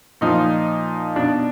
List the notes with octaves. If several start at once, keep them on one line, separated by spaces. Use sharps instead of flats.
A#2 F3 D#4
B2 D4